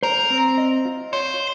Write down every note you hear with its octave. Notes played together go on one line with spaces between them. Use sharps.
A#4 C5
C4
D#5
F4
C5 C#5